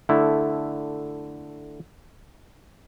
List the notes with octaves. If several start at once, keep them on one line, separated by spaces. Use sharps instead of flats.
D3 A3 E4